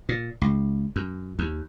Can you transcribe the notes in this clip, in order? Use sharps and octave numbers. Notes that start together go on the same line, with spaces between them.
A#2
C#2
F#2
D#2